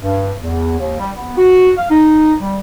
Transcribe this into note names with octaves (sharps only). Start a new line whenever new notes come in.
G2
E2
D#2
G3
B3
F#4
F5
D#4
G3